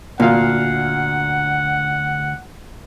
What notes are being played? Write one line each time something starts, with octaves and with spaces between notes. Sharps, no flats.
D2 A#2 F5 F#5